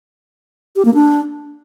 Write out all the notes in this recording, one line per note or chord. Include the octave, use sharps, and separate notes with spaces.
G4
A#3
D4